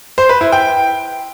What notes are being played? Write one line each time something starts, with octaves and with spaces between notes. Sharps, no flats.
C5
B4
E4
G5